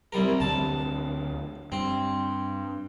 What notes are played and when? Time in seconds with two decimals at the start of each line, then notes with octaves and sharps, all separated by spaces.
0.12 C2 G3 A#4
0.40 D2 D3 C4 A5
1.72 G2 C4